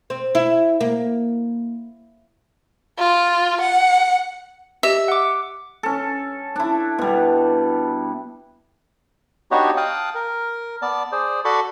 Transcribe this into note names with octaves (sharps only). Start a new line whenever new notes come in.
C4
E4
A#3
F4
F#5
G4 D#5 E5
F#5 D6
C#4 A4
D4 E4
B2 G3
B3 D4 D#4 F#4 G4 C#5
F5 G5 A5 D#6 F#6
A#4
B3 D5 A5
G#4 C5 D5
F#4 A4 D5 A5 B5 C#6